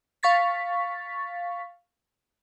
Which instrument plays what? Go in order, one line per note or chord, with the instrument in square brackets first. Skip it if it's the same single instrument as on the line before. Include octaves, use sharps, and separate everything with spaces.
[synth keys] F5 C#6 A6 B6